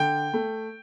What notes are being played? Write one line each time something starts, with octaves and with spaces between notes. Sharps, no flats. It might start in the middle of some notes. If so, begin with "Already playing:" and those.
Already playing: D3 G5
A3